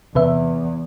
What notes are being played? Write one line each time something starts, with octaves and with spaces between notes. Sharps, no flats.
E2 C3 B4 E5